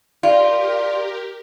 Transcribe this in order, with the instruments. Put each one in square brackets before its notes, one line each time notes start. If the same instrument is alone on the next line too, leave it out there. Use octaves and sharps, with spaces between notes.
[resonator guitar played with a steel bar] F4 [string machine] G4 A#4 [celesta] D5